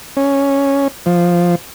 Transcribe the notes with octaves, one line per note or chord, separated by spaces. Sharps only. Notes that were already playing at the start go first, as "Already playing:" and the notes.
C#4
F3